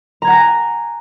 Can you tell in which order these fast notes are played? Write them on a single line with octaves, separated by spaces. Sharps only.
A#5 G#6 F#5 A#6 G#5